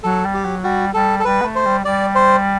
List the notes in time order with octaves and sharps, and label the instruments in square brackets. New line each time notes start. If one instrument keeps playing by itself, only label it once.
[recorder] F#3 [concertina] A4
[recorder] G3
[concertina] G4
[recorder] F#3
[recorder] G3 [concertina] F#4
[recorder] G3 [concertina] A4
[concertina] A4
[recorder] G3 [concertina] B4
[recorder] B3
A3
[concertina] C5
[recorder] G3
[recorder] G3 [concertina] D5
[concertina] C5